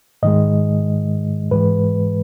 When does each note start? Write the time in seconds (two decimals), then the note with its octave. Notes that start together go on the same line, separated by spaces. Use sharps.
0.23 G#2 D#3 G#3 D#5
1.51 G#2 E3 G#3 B4